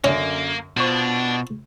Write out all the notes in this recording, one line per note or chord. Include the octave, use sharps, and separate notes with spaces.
F#2 D3 A#3 C#4
B2 D4 F4 C5 C#6